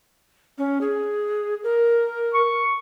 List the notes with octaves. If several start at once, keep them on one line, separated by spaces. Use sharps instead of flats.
C#4
G#4
A#4
C#6